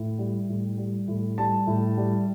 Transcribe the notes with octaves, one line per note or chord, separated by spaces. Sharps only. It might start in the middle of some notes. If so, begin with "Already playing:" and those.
Already playing: A2
G3
A2
G3
A2
G3 A5
A2
G3